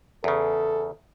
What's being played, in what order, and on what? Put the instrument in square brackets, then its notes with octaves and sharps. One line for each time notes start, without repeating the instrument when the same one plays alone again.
[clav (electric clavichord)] E2 C#3 [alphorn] A4